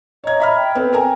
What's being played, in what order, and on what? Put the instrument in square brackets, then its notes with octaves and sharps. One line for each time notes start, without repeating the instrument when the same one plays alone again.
[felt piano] C#5 G#6 [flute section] D#5 A#5
[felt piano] E5 B5 F6
[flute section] G5
[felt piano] B3 C4 [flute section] A4
[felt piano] A#4 G#5 A#5 [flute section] G5